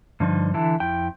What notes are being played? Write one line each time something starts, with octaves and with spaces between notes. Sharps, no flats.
G2 D3 F3 D#4
D3 E3 E4 A5
F2 E4 G5